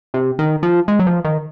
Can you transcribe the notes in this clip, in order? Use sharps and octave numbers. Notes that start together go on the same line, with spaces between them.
C3
D#3
F3
G#3
F#3
F3
D#3